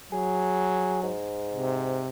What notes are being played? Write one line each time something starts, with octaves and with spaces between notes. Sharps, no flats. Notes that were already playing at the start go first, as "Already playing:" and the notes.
F#3 G#4
G#2
C3